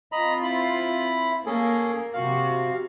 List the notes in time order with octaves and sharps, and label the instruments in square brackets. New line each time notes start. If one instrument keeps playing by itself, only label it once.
[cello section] C4 F4 [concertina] D#5 A#5 B5
[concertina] E4 B5
[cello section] A#3 [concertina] C#4 G#4 A4
[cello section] C3 F#4 [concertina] F5